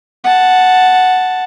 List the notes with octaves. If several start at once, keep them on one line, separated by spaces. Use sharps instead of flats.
F#5 A5